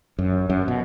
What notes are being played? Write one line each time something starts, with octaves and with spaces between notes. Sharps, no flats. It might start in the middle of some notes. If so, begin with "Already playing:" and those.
F#2
F#2
B2